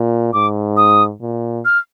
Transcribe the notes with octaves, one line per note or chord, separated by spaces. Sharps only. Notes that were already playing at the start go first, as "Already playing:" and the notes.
Already playing: A#2
G#2 D6
D#6
A#2
F6